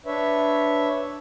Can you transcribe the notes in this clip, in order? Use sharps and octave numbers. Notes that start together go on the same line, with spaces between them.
D4 B4 C#5 E5